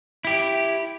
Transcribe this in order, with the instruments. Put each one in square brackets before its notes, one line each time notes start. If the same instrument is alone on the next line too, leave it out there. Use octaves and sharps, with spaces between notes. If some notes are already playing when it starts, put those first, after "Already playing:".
[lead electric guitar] E4 G4